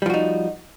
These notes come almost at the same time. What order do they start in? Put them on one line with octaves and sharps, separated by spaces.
G3 F3 F#4 D#4